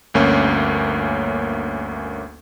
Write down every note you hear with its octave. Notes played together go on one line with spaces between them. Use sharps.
G1 D2 A#3 C#4